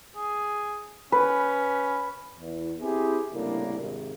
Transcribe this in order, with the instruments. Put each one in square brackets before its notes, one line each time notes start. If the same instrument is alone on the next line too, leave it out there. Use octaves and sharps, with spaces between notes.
[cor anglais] G#4
[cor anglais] C#4 [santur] B4
[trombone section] E2
C4 E4 G4 G#4
C2 A2 C#3 A#3 D4
G#1 C3